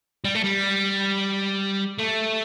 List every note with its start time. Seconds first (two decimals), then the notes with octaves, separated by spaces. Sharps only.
0.24 G3
0.35 A3
0.43 G3
1.98 A3